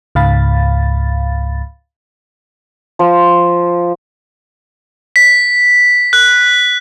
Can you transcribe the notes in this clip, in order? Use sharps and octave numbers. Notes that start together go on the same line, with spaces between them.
C#2 G#2 F5 B5 A6
F3
B6
F#6